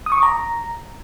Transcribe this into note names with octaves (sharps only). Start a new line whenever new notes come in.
D#6
C#6
D6
A#5